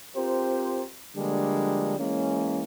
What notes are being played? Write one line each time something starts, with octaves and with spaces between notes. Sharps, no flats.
C4 F4 G4 A#4 C5
D3 F3 G3 G#3 A#3 D4
E3 G#3 A#3 C#4